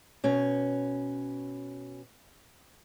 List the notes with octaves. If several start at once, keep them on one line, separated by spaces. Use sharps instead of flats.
B2 C#4